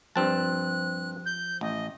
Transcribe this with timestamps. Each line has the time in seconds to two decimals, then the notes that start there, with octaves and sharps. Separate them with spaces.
0.16 G2 F3 C4 A5 F#6
1.26 G6
1.61 A1 D#5